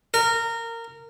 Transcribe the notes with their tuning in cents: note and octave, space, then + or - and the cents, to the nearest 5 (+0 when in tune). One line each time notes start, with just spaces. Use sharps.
A#4 -20